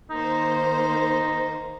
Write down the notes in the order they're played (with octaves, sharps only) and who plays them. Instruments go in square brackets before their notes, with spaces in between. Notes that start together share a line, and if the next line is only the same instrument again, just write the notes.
[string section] D#3 A#3 C5 [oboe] D#4